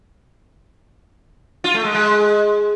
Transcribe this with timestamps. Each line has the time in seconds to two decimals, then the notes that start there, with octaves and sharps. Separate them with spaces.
1.64 F4
1.74 A3
1.84 G#3
1.95 G#3